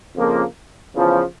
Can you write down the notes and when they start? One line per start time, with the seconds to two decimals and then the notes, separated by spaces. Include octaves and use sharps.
0.16 F2 C#3 F3 A#3
0.95 E2 C#3 F3